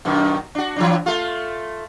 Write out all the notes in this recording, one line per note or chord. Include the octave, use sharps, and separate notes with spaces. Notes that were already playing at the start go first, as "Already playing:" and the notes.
F#2 B2 D#3
D4 F#4
E3 F#3 D4
A3 F4